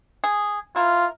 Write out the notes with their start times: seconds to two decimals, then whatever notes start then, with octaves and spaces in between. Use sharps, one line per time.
0.24 G#4
0.76 E4 F4 A#4